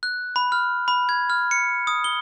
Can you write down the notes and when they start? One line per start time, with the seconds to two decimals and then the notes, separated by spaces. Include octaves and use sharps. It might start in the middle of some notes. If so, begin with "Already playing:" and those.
0.03 F#6
0.36 B5
0.52 F6
0.88 B5
1.09 G#6
1.30 F6
1.51 C#7
1.87 D#6
2.04 G7